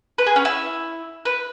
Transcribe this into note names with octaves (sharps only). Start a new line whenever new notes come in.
B4
G#4
C#4
E4
B4